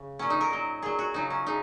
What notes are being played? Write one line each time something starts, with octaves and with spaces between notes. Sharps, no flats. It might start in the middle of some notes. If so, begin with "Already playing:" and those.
Already playing: C#3
A#2 F#3 C#4
D#4
A#4
A#2 F#3
A#2 F#3 G#4
F#4
C#3 F#3 D#4
C#4
C#3 D#4